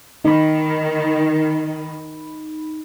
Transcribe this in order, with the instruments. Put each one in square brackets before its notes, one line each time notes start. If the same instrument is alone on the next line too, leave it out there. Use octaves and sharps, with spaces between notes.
[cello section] D#3 [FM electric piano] D#4 B5